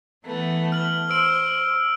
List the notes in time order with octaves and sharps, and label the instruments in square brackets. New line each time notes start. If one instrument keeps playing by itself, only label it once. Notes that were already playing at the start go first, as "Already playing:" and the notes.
[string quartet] E3 A3 B3
[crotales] F6 F#7
[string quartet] C5 [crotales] E6 D7